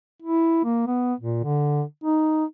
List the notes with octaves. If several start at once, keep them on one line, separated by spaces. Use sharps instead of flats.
E4
A#3
B3
A#2
D3
D#4